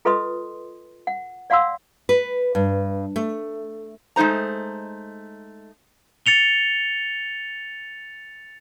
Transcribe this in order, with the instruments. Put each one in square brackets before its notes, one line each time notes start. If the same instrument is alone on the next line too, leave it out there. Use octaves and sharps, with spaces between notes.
[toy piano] F4 A4 B4 D#5 C6 D#6
F#5
D5 F5 F#5 C6 E6
[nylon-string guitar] B4
G2
A3
[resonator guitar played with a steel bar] G#3 A3 D#4 C5 A#5
[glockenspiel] A6 C#7 F7 G7